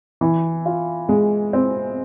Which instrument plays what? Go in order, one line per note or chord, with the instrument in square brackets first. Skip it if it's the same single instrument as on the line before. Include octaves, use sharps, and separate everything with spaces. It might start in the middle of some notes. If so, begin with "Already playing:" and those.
[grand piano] E3
F4
G#3
C4